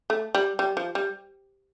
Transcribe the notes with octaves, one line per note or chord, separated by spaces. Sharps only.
A3
G3
G3
F3
G3